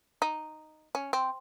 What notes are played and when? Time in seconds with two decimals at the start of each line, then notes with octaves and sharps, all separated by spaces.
0.22 D#4
0.95 C#4
1.13 C4